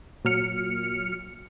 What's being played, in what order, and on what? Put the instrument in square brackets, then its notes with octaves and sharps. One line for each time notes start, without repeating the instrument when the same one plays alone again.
[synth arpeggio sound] A#2 F#3 F6 C#7